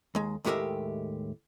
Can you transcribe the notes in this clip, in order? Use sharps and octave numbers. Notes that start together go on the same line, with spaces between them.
D#2 G#3
D#2 A2 G#3 G4 A#4 E5